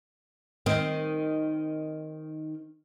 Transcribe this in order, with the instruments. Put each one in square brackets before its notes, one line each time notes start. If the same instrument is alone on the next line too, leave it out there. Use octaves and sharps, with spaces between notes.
[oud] D#3 C4